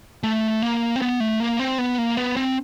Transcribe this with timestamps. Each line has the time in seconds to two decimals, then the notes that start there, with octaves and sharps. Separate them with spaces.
0.23 A3
0.62 A#3
0.96 C4
1.02 B3
1.20 A3
1.40 A#3
1.59 C4
1.78 B3
1.98 A#3
2.17 B3
2.37 C4